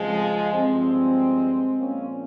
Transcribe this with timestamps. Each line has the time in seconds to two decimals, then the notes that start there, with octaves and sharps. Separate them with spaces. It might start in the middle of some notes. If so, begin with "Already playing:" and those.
Already playing: F2 C#3 F3 G#3
0.54 G2 F3 G#3 C4
1.79 A#2 F3 A#3 C#4